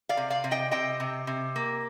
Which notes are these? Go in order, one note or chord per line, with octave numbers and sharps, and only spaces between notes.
D5 F5
C3
D5 F5
C3
D#5 G5
C3 D#5 G5
C3
C3
A#3